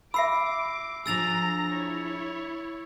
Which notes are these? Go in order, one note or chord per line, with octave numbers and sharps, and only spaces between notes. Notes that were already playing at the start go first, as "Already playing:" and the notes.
E5 B5 D6 E6 C7
F3 D4 G#4 A#5 E6 A6 A#6 F7
E4 C#5